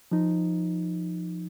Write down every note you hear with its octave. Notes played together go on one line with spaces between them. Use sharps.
F3 D#4